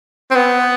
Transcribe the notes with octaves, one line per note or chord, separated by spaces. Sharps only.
C4
B3